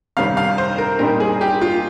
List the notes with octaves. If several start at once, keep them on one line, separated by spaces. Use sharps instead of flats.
C2 C3 D#3 G3 C#4 F5
F5
C5
A#4
A#2 G3 C4 D#4 A#4
G#4
G4
F4